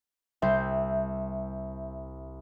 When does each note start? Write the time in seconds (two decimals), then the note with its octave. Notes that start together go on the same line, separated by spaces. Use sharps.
0.42 C2 C5 E5 G6